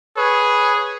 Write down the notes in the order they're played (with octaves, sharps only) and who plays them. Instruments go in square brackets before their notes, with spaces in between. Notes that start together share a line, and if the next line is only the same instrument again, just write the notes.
[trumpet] G#4 [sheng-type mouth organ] B4 C#5